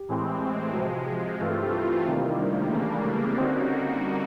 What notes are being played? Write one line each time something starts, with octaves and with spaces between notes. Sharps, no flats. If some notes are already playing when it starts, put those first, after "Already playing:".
Already playing: G4
A2 E3 G#3 C4
C3 F3 G#3 F#4
G2 E3 A3 C4 F4
G4
G4
F4
F4
F#4
C3 D#3 G3 A#3 F4
E4
D#4
D4
A3
G#3
C#3 E3 G3 A3 A#3 D4
G#3
A3
A#3
C4
D3 G3 A#3 C4 D#4 F#4
C#4
C#4